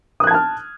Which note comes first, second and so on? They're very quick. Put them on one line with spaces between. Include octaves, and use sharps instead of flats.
D#6 F#6 G#6 A5 F6